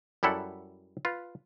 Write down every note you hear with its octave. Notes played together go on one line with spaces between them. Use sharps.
F#2 G3 E4 A4 F#5
F4 B4